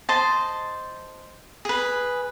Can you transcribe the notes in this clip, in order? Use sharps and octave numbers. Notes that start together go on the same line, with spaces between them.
C5 D#5 A5
G#4 B4